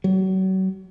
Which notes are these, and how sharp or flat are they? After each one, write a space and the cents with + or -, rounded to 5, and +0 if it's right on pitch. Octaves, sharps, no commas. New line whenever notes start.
F#3 +35